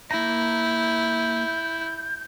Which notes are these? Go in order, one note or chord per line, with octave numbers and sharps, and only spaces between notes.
A#3 E4 A#5 G6